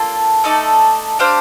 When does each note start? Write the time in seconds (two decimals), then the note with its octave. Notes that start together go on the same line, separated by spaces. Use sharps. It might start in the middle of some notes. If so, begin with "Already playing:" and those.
Already playing: A#3 D4 F4 A4
0.44 A3 D#4 A4 D5
1.19 D4 G4 C5 F5